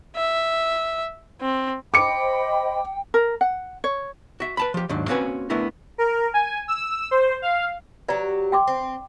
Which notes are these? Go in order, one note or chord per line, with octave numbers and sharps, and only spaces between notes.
E5
C4
C5 D#5 G5 B5 D6 C#7
A#4
F#5
C#5
F#4 E5
B4 A5 B5
F3 G4
D#2 G#2 F#3 D4
A#3 C4 C#4 F#4 B4 G#5
A3 B3 D4 E4 A#4
A#4
G#5
E6
C5
F5
F#3 G4 B4 D5 A#5
G5 C6 D6
C4